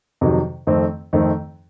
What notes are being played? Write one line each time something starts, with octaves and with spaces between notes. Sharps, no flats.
F2 C3 D#3 F#3
F2 D#3 A3 C4
F2 D#3 A3 C4